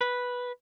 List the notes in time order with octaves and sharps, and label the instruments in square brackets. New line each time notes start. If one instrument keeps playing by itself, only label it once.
[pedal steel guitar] B4